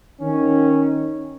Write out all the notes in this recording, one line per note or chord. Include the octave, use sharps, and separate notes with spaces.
D#3 C#4